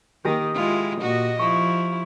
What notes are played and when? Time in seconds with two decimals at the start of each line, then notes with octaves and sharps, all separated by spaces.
0.25 D#3 A#3 G4 D#6 A#6
0.54 G#3 E4 F4
1.01 A#2 F#4 D#5
1.39 F3 E4 C#6